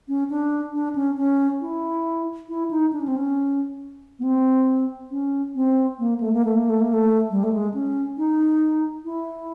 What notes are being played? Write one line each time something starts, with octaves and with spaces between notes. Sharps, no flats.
C#4
D4
D4
C#4
C#4
E4
E4
D#4
D4
C#4
C4
C#4
B3
C4
C#4
C4
A#3
A3
A#3
A3
A#3
A3
A#3
A3
G3
A3
G#3
C#4
D#4
E4